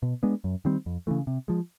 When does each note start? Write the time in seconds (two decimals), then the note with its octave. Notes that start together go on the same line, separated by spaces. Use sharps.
0.03 B2
0.23 G#3 B3 D4
0.44 F#2
0.65 D#3 G3 C4
0.86 F2
1.07 C#3 E3 A3
1.27 C3
1.48 F3 G#3